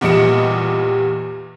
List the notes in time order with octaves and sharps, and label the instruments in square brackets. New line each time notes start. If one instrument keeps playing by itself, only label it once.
[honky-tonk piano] E2 A#2 G3 D#5 C#7 E7